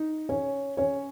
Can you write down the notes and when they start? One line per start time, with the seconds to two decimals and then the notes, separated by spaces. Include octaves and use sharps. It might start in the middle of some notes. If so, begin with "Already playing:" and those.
Already playing: D#4
0.29 C#4 C#5
0.77 C#4 C#5